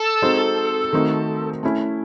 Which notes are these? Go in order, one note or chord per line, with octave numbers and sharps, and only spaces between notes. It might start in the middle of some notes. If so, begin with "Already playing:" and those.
Already playing: A4
G#3 C4 D#4 F#4 C5
D#3 A3 C4 D#4 F#4
A3 C#4 E4